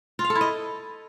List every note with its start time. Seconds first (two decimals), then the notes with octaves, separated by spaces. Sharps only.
0.19 F4
0.24 F5
0.30 A4
0.35 E4
0.41 D#5